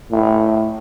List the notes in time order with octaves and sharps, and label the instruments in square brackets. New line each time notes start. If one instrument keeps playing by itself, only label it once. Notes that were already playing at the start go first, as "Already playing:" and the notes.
[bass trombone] A2